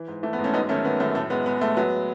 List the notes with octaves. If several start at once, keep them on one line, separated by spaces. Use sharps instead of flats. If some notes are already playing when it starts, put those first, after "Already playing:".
Already playing: E3
G#2
E3 A3
B3
G#2
A3 C#4
F#2 B3 D#4
D#3 A3 C#4
D#3 B3
F#2 A3
A2 A3
G#3 B3
G#3 B3
G#3 A3
F#3 B3